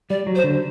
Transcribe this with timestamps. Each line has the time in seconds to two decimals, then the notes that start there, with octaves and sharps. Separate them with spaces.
0.10 G3 D5
0.27 F#3
0.35 C5
0.44 D3